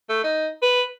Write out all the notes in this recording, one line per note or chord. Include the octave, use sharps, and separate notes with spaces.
A3
D#4
B4